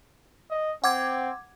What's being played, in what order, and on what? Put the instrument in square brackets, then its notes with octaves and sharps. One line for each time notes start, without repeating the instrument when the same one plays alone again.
[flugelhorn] D#5
[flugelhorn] C4 [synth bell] F#5 D6 G#6